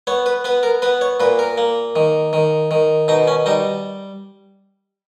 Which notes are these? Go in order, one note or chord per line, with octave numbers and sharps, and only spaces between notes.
B3 C#5
B4
B3 B4
A#4
B3 B4
C#5
A#2 B4
A#4
A#3
D#3
D#3
D#3
B2 D#4
C#4
G3 D#4